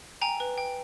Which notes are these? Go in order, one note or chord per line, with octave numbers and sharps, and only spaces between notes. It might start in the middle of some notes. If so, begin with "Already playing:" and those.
G5 G#5 A#5
B4
G5